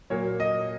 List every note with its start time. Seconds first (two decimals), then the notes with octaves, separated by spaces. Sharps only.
0.10 A#2 F#3 A#3 C#5
0.40 D#5